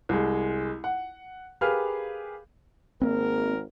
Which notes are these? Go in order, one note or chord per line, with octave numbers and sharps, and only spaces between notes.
C2 G#3
F#5
G4 G#4 A#4 B4 F5 F6
G#1 A#3 C4 A#4